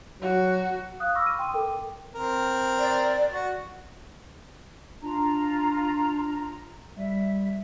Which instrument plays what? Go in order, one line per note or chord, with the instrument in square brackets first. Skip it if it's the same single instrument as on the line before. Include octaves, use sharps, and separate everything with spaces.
[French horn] F#3 [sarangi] F#4
[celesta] F5 D#6 F#6
B5 C#6 D6 E6 F6 A#6
D#7
G5 C6 D#6
A4 A#4 G5 D6
[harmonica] C4 A#4
[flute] D5
[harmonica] F#4
[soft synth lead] D4 [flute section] F4 A#5
[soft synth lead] G3 [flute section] E5